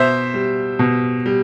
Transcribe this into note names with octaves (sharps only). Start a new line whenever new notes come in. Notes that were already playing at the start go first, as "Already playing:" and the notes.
Already playing: B2 C5 E5
G3
B2
G3